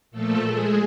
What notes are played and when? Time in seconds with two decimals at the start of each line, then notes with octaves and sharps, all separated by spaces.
0.11 A#2 F3 A3 A4
0.45 G#3 G#4